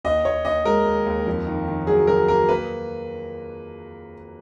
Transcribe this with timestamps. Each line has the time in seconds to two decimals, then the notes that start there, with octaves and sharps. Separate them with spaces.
0.04 D#2 D#5
0.25 D#2 C#5
0.45 D#2 D#5
0.65 G#3 A#4
0.86 D#2
1.06 D#2
1.26 F2
1.47 D#3
1.68 D#3
1.87 F#3 G#4
2.07 F#3 A#4
2.28 A#3 A#4
2.48 A#3 B4